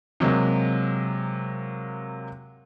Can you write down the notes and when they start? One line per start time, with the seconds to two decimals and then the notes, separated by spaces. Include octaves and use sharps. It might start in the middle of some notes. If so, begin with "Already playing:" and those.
0.20 C3 F#3 G#3 A#3